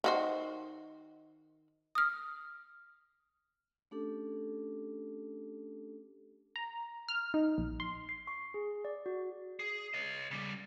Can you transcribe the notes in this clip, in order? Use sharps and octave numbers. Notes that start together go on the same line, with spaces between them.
D#3 F#4 C5
D#6 F6
A3 C#4 D4 G4 A4
A#5
F6
D#4
A#1
C6
C7
C#6
G#4
D5
F#4
G#4
C#5 D#5
C#3 G3